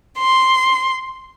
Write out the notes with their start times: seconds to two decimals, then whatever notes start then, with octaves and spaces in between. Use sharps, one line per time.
0.17 C6